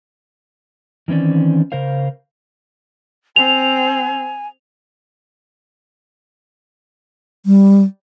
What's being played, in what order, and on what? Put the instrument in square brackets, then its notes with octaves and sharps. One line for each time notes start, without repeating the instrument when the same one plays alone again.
[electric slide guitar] D#3 E3 C4 C#4 D5
C#3 A#4 C5 F5
[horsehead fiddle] C4 [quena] G#5 [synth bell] F7
[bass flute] G3